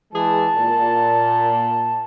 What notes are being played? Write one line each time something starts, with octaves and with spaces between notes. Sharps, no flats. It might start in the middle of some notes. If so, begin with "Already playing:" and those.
E3 G#3 G#4 A5
A#2